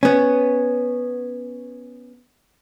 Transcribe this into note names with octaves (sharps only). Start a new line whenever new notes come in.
B3 C#4